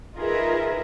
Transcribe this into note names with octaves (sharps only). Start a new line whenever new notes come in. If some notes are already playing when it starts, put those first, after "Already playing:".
D#4 F4 G#4 A#4 B4 E5